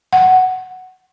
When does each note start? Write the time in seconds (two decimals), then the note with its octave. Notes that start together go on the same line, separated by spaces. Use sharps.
0.13 F#5